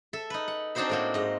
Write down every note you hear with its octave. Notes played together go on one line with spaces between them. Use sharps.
A4 E5
D#4 B4
F#5
C4 D4 D#4 F#4 C5 E5
A2 A#3 F#4
G#2 D#5